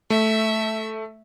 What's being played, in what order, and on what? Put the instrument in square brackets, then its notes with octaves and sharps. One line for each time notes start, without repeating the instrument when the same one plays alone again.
[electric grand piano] A3 [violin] E5